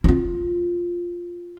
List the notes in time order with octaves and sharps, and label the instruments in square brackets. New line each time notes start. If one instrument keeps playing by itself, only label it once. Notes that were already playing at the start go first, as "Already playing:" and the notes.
[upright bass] E4 F4